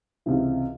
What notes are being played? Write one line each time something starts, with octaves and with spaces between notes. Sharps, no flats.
C#2 C3 E3